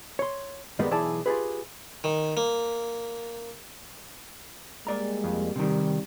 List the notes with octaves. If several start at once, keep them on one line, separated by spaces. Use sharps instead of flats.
C#5 C6
G2 D#3 G3 G#3 A#3 B3
B1 E3 E4 G#4 D5 A5
F4 G4 G#4 B4
D#3
A#3
G3 G#3 A#3 D5 A#5
F2
C3 D#3 G3